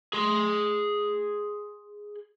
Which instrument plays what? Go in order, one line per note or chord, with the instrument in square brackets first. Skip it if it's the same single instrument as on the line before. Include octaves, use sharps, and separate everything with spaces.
[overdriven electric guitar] G#4 C6